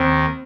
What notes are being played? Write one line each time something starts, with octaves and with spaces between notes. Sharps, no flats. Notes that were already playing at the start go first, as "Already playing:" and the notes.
Already playing: D#2 D#3 C4